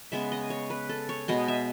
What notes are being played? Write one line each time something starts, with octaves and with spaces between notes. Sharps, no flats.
C#3 G#3 B3 E5
D#5
C#5
B4
A4
C#5
B2 G#3 B3 D#5
E5